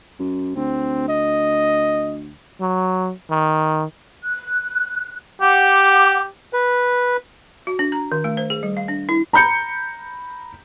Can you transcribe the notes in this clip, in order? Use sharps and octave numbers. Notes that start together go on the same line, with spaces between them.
F#2
D2 C4
D#5
F#3
D#3
F#6
G4 F#5 D6
B4
F#4
D4
A#5
D#3
A3
C5
G#4
G3
F5
D4
E4
A#5 B5 G6 C#7